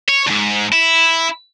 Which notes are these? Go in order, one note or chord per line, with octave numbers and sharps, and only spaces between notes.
C#5
D2 G#2
E4